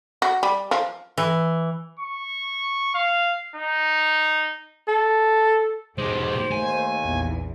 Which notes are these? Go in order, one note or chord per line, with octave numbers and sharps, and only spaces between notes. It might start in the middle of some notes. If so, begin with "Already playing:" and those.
F#4
G3
F3
E3
C#6
F5
D#4
A4
G#2 B2 G#3 G4 C5
D#2 A3 G#5
A#1 E2